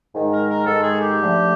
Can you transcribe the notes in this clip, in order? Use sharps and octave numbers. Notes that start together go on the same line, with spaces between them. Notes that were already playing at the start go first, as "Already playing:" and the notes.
G#2 D#3 G#3
A#4
A#4
G#2 D#3 G#3 A4
G#4
G4
D3 F3 A3